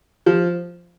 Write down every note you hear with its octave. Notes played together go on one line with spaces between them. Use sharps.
F3